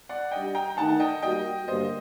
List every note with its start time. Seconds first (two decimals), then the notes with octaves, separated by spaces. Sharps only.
0.09 D5 F#5
0.31 G3 D4 G4 D#5 G5
0.55 G5 A#5
0.77 D#3 A3 D#4 F#5 A5
1.00 D#5 G5
1.23 G3 A#3 F#4 D#5 G5
1.68 G2 D3 G3 A#3 C5 D#5